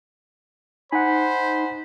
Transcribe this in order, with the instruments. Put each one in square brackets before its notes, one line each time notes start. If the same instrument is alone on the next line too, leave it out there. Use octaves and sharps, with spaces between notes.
[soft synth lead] D#4 [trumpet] C5 [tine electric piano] F#5 G#5 [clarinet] B5